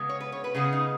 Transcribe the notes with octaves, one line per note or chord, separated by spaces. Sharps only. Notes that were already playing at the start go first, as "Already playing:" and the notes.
Already playing: C#3 G#3 B3
C#5
B4
C#5
B4
C#3 G#3 B3 G#4
D#4